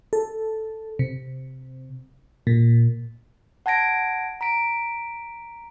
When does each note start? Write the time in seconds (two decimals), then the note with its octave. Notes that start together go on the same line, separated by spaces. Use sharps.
0.13 A4
0.99 C3
2.47 A#2
3.66 F#5 A5 G#6 A#6 D7
4.41 A#5 B6 D7